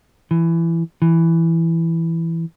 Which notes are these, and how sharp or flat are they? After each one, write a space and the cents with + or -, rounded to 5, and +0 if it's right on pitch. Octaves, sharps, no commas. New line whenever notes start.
E3 +15
E3 +5